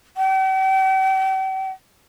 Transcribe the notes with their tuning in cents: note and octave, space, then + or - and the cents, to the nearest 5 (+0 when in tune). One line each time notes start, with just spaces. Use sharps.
G5 -45